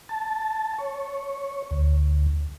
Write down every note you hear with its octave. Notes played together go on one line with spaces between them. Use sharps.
A5
C#5
D2